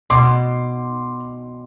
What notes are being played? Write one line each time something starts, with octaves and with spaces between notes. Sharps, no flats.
B2 C6 D6